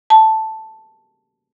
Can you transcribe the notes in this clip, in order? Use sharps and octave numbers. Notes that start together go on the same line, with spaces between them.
A5